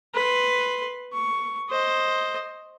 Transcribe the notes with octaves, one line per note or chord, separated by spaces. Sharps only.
B4 C6
C#6
C5 D#5